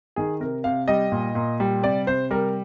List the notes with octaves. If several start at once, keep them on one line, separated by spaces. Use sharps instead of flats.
D#3 G#4
C3 A#4
C3 F5
G3 D#5
A#2
A#2
G3
C3 D5
C3 C5
G3 A#4